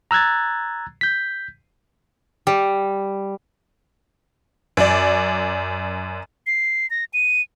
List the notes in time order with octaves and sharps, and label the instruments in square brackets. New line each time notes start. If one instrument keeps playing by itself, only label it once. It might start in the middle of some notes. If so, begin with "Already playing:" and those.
[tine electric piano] A#5 E6 F#6 G#6 A6
G6 B6
[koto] G3
[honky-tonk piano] F#2 D5
[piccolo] C7
A#6
D#7